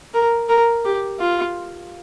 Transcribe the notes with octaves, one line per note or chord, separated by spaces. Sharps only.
A#4
A#4
G4
F4